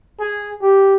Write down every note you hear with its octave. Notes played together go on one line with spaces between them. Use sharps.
G#4
G4